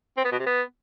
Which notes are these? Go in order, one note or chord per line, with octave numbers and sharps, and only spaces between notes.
C4
B3
B2
C3
B3